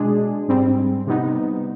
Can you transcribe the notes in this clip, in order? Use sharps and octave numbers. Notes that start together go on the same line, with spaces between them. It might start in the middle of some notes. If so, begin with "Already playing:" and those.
Already playing: B2 G#3 D4 G#4
G#2 G3 C4
C3 G3 B3 D#4